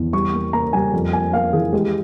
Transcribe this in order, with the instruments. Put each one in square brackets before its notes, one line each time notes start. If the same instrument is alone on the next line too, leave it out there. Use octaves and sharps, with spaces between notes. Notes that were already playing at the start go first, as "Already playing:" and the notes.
Already playing: [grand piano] E2
G3 C#6
A#3
A#3 A#5
G3 G#5
F2
A#3 G#5
A#3 F5
E3 G#4
G#3 G4